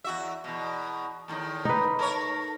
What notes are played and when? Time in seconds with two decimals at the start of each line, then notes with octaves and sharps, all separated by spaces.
0.04 E2 F#4 E5
0.44 E2 B2
1.28 E2 A2 D#3
1.65 D#4 B4
1.99 A3 A#4 C#5